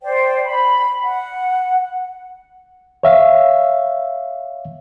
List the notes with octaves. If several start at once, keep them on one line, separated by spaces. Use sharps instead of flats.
C5 D5 G5
B5
F#5
C#5 E5 F5